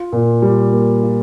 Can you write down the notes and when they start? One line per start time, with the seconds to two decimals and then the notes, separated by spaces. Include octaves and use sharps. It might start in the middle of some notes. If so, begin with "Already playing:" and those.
Already playing: F4
0.13 A#2
0.42 G3
0.73 A#3
1.03 F4